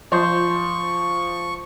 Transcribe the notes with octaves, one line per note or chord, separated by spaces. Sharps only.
F3 C5 C#6